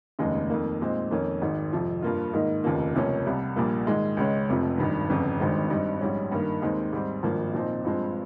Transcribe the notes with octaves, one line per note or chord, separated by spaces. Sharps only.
F1 D#2 C#3 G#3 D#4
F2 D#3 A#3
A#2 G#3 C4 D#4
F2 D#3 A#3 C#4
G#1 G#2 D#3
F2 C3 F3
G2 F3 A#3 F4
G#2 D#3 A#3 D#4
F1 D#2 C#3 F3 A#3
C#2 C3 F3 A#3 C#4
C2 C3 G3
A#1 A#2 G3 A#3
G#2 D#3 G#3
C#2 C#3 G#3 C#4
F1 F2 C3 F3
G#1 G2 D#3
G1 F2 C#3
G#1 G2 D#3 G#3 C4
G2 G3 C4 D#4
A#1 G#2 G3 C#4
G2 D#3 A#3
D#2 D#3 G#3 C4
G#2 G3 C4
G#1 G2 F3 A#3
A#2 F3 C4 D#4
G2 F3 G#3 C4